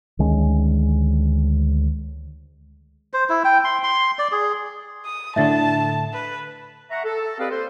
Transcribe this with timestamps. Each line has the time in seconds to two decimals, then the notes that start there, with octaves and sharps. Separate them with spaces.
0.19 D2 D#3 G#3 C#4
3.13 C5
3.29 E4
3.45 G5
3.64 C6
3.83 C6
4.19 D5
4.32 G#4
5.05 D#6
5.36 A2 D3 A3 E5 A5 A6
6.13 B4
6.91 E5 F#5 A#5 C#6
7.04 A4
7.39 C4 G4 B4 D5 D#5 F5
7.51 A#3 A4 C5